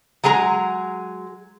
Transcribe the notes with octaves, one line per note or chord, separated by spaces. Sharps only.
F#3 G#3 G#4 A#5